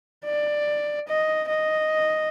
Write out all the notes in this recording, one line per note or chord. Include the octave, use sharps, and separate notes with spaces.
D5
D#5
D#5